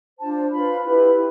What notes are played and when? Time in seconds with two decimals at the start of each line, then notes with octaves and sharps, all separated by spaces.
0.18 D4 F4 C5 A5
0.51 F4 B4 B5
0.85 E4 G4 B4